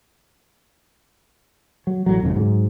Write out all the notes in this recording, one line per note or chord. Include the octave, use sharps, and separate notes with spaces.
F#3
A1 F#3
G#1 F2 G#2 C#3
G#2 F#3